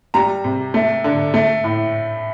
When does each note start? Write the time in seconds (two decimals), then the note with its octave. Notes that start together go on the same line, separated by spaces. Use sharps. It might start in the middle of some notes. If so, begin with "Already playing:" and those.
0.14 G3 A#5
0.44 C3
0.74 A3
1.04 D3
1.34 A3
1.64 A2